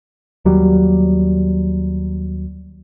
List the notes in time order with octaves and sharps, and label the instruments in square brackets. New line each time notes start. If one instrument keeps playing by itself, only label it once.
[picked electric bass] D#2 F#3 G3